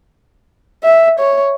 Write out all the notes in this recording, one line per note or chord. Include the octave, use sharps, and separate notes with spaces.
E5
C#5